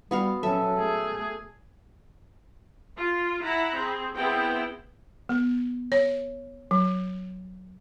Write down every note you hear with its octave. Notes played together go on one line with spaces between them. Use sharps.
G3 B3 F#4 F5
F#3 C#4 A4 E5
A3 G#4
F4
E4 F#5 A#5 B5
C4 G#4
B3 C4 E4 G#4 G5
B3
C#5
F#3